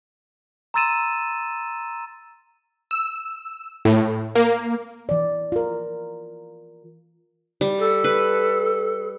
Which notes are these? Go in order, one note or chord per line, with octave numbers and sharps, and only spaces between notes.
A#5 C6 E6 A6 D#7 E7
E6
A2
A#3
E3 D5
F4 A#4
G3
A4
B4